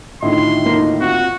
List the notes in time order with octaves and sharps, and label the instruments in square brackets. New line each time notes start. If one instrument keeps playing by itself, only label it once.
[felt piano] A2 D3 D#3 [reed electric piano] E4 F4 D#5 [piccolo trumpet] C6
[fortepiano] A#3 D#4
[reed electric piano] C4 F4 [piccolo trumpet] F#4